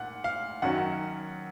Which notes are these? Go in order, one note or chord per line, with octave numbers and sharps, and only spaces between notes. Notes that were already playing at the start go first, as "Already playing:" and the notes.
Already playing: A#2 F#5
F5
F#2 D#3 F#3 C#4 F#5